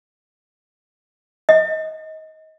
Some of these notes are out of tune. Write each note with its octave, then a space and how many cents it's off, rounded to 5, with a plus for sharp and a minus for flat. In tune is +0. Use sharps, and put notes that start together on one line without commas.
D#5 +20